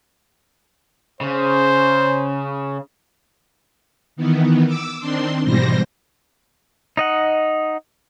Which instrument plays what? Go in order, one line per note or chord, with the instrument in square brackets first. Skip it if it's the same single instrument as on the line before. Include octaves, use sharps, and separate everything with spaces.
[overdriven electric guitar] C#3 [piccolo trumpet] C5
[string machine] D#3 E3 B3
D6 E6
D#3 C4 D4 C6
G#2 B2 E3 G3 C5 A#6
[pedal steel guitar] D#4 D#5 F#5